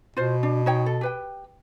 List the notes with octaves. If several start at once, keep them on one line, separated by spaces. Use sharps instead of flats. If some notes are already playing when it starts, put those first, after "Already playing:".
B2 F4 C5
D4
D#4 C#5 G5
A4
G4 B4 G5